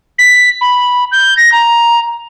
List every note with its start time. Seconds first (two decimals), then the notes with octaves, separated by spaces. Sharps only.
0.19 B6
0.61 B5
1.12 G6
1.37 A#6
1.52 A#5